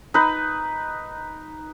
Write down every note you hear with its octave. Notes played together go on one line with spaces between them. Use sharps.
D#4 B4